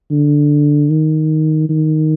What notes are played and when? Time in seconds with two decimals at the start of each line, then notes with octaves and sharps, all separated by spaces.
0.11 D3
0.90 D#3
1.69 D#3